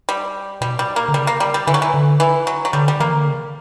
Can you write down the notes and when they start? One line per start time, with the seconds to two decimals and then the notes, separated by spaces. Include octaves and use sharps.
0.09 G3
0.61 B2 G3
0.79 G3
0.96 A#3
1.08 D3
1.14 C#3 G3
1.27 A#3
1.40 G3
1.54 G3
1.67 D3 E3
1.74 F#3
1.82 E3
1.94 D3
2.20 E3
2.47 F#3
2.65 F#3
2.73 D3 G3
2.88 G3
3.00 E3 A#3
3.13 D3
3.26 C#3